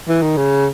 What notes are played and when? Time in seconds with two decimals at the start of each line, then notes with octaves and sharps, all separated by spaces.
0.08 E3
0.22 D#3
0.37 C#3